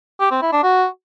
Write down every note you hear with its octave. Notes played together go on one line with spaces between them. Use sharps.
G4
C4
E4
D4
F#4